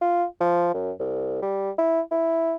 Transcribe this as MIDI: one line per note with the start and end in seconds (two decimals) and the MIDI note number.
0.01 0.25 65
0.41 0.73 53
0.74 0.91 42
0.99 1.41 36
1.42 1.71 55
1.78 2.01 64
2.11 2.56 64